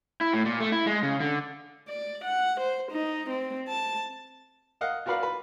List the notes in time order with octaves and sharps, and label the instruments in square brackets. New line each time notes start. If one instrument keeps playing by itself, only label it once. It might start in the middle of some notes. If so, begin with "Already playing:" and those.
[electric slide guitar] E4
A2
A#2
A3
E4
G#3
C#3
D3
[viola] D5
F#5
C5
D#4
C4
A5
[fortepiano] A#4 D#5 F5 F#5
F4 F#4 A#4 B4 D5 F5
B4